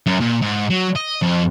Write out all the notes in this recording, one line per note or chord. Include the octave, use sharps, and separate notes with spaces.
F#2
A#2
G#2
F#3
D#5
F2